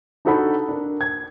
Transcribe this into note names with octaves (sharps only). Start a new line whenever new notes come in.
D4 D#4 F#4 A4 F#5 B5
D4 A#4
G#6